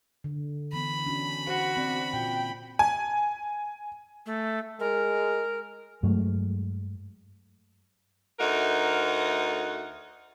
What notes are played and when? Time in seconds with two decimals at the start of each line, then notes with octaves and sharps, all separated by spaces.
0.24 D3
0.73 E3 B3 B5
1.07 C#4 D4 F#4
1.47 F#4 C5
1.77 C4 D5
2.13 A#2 F4 G5
2.79 G#5
4.26 A3
4.80 G#3 A#4
6.03 G2 F#3 G#3 A3
8.39 D2 A3 D#4 A#4 F#5